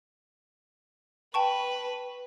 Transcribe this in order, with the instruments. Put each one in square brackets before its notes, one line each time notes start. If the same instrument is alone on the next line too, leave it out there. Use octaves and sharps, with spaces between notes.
[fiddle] B4 [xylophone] G5 A5 C#6